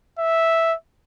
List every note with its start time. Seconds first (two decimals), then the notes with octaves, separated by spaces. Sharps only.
0.19 E5